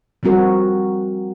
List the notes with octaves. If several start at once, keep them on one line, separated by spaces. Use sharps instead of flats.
F3 G3 C4 F#4 A#4